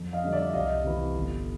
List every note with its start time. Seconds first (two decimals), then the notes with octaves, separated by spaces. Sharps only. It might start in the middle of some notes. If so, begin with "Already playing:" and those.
Already playing: F2
0.13 D#5 F5
0.23 D3 G3
0.32 D5 E5
0.53 C2 D#5 F5
0.84 C3 E3
1.14 G1